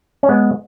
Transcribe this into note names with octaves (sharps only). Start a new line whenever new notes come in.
C#4
G#3 B3